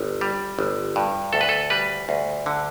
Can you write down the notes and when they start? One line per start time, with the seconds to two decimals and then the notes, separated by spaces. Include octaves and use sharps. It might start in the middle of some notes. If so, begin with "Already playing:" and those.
Already playing: G1
0.21 G3
0.59 G1
0.96 G2
1.33 D2 A4
1.41 B4
1.49 A4
1.70 G3 B4
2.09 D2
2.46 D3